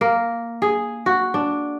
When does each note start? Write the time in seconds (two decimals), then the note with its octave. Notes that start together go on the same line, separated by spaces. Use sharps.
0.01 A#3
0.62 G#4
1.06 F#4
1.34 D4